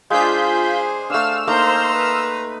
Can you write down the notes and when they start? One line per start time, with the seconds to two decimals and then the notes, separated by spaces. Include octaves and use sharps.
0.10 G#3 D4 F4 G#4 C5 G6 B6
1.10 A3 D4 F5 E6 F6 E7
1.47 A3 A#3 D#4 C5 A#5 C6
1.95 B4